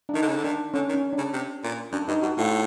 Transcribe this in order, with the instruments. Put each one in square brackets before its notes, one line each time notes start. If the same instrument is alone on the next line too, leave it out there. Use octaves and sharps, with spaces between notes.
[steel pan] D4
[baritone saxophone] D#3 [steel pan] D#4
[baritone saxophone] D3
C#3
D3
[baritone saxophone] D#3 [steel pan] D4
[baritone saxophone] D3 [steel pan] C#4
[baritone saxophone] D#3
[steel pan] C#4
D4
[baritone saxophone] C#3
C3
A#2
[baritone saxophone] F#2 [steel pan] D4
[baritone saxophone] G2 [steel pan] D#4
[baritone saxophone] G2 [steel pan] F#4
[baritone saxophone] A2 [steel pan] F4